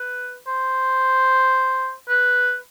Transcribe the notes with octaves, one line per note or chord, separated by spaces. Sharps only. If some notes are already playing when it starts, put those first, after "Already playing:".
Already playing: B4
C5
B4